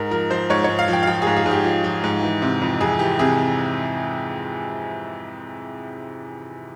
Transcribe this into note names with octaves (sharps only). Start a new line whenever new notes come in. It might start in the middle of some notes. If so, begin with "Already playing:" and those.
Already playing: G#2 A#4
F3 A#4
F3 C5
G#2 C#5
G#2 C#5
F5
F3
G5
F5
F3 G5
G#4
G#2
G#4
G#2
G4
F3
F3
G#2
E3
C3
F2
F2 G#4
E3 G4
C3 G#4